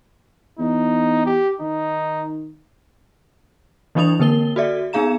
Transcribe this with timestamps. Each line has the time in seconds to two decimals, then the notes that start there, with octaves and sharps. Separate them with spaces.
0.59 E2 D#4
1.26 G4
1.60 D#3 D#4
3.95 E3 F#3 D4 E4 D#6 F7
4.19 D3 A#3 A#4 G7
4.56 F#4 A4 D5 E5
4.93 B3 D#4 G#4 F5 A#5 E7